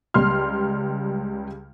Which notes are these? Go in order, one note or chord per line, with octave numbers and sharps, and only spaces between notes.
C#2 G3 C6 F6